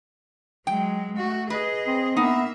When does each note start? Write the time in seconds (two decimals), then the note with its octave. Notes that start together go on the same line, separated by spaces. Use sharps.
0.67 F#3 G#3 G5
1.17 A3 F#4
1.50 G#4 B4 D#5
1.87 C4
2.16 A#3 B3 D#4 E5